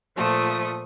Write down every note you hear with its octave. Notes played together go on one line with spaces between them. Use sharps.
A#2 F3 A3 D#6